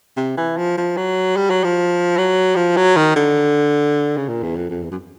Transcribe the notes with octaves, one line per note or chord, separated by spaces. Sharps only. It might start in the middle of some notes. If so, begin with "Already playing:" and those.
C3
E3
F3
F3
F#3
G3
F#3
F3
F#3
F3
F#3
D#3
D3
C#3
A#2
E2
F2
F2
E2
F#2